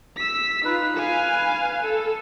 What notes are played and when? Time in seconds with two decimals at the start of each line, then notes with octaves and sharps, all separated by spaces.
0.17 E6 B6
0.65 D#4 F4 B4
0.98 F5 G#5
1.83 A4